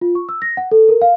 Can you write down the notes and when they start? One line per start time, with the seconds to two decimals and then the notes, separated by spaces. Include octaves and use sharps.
0.01 F4
0.15 C#6
0.29 E6
0.42 A#6
0.57 F#5
0.72 A4
0.89 A#4
1.02 F5